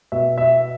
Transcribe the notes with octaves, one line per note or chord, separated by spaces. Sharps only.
B2 E5
E5